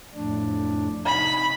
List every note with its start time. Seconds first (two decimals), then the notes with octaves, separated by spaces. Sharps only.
0.15 F2 A2 D4
1.06 C3 D#4 B5